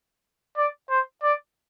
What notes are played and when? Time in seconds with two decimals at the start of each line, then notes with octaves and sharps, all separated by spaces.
0.57 D5
0.90 C5
1.23 D5